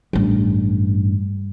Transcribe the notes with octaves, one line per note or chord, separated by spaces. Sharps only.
A1 G2